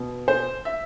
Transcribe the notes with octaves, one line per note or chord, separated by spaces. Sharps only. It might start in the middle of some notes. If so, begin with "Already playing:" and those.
Already playing: B2
C5
E5